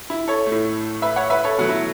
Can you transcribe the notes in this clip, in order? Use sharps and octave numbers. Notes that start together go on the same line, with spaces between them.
E4
A4 C#5
A3
A2
B4 E5
C#5 F#5
B4 E5
A4 C#5
B2 F#3 A3 F#4
E4